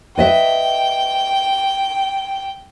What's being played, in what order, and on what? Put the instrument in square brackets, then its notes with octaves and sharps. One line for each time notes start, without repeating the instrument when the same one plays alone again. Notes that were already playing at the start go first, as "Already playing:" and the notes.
[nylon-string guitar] B4 D#5 E5 [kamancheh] G5